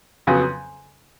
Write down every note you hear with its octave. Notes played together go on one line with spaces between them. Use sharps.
F2 C#3 F#3 B3